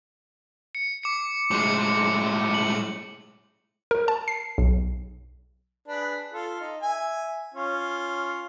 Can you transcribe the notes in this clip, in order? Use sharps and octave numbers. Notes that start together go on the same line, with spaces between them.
C#7
D6 C#7
A2 G#3 D6 C#7
F#7
A#4
A5
C7
B1
D4 G#4 B4
F4 A4
D#4
E5 G#5
C#4 F4